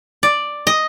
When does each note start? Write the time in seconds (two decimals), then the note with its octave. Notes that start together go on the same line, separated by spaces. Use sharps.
0.23 D5
0.67 D#5